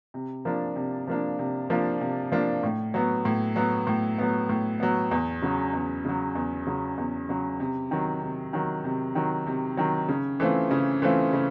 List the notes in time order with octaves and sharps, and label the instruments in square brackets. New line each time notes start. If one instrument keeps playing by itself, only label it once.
[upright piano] C3
F3 A#3 D4
C3
F3 A#3 D4
C3
F3 A#3 D4
C3
F3 A#3 D4
A2
F#3 B3
A2
F#3 B3
A2
F#3 B3
A2
F#3 B3
E2
C#3 F#3
E2
C#3 F#3
E2
C#3 F#3
E2
C#3 F#3
C3
D#3 F#3
C3
D#3 F#3
C3
D#3 F#3
C3
D#3 F#3
C#3
E3 A3 C4 F4
C#3
E3 A3 C4 F4
C#3